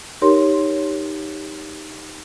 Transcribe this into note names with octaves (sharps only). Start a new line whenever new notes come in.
D#4 G4 A#4 C#5 C6